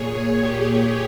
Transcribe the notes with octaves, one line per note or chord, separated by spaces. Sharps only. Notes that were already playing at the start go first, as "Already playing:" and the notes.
Already playing: A#2 G#4 C#5
G4